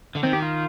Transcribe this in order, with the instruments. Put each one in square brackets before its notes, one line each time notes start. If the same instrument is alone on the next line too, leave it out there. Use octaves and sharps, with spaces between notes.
[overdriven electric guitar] D3
[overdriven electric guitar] D#3 [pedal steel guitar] C4
[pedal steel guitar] G4
F4